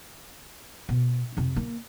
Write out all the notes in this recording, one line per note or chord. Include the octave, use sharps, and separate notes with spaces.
B2
F2 C3
A#3